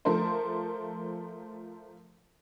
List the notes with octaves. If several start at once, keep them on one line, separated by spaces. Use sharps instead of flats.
F3 A3 A4 A#4 C5